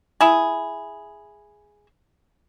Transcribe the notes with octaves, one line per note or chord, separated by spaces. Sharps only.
E4 G#4